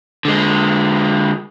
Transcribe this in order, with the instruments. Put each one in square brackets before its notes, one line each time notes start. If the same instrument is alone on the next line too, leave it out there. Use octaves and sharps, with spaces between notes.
[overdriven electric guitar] D3 G#3